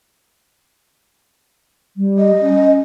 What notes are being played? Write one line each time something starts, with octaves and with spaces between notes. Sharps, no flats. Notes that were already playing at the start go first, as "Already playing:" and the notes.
G3
D#5
C#4